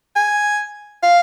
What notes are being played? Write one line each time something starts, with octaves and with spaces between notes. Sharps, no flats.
G#5
F5